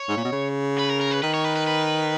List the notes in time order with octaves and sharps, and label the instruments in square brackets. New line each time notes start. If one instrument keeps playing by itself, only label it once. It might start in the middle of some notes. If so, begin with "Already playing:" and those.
Already playing: [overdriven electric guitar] C#5
[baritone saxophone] G#2
A#2
B2
C#3
[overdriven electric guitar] B4
A#4
A#4
B4
[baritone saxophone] D#3 [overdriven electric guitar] B4
[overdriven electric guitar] C#5
B4
B4
B4